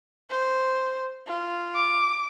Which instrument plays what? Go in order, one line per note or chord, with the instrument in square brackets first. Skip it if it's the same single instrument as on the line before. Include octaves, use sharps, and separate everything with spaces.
[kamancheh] C5
F4
[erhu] D6